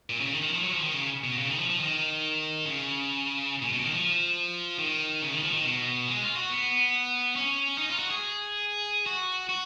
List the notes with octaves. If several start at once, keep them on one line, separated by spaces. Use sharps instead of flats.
A#2
C#3
D#3
D#3
F3
F#3
F3
D#3
C#3
B2
C#3
D#3
F3
F3
D#3
C#3
A#2
B2
D#3
F3
D#3
C#3
D#3
F3
D#3
B2
G#3
F4
F#4
B3
C#4
D#4
F4
F#4
G#4
F#4
F#4